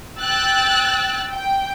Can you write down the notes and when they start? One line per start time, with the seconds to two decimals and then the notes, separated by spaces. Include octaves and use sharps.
0.19 G5 E6 F#6 A6
1.32 G5